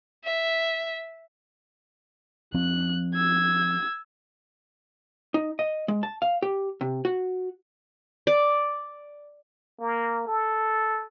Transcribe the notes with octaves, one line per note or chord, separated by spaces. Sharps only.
E5
F3 C4 F#6
E6 G#6
D#4
D#5
G#3
A5
F5
G4
C3
F#4
D5
A#3
A4